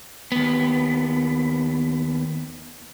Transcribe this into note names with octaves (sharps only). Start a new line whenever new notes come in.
D#2 B3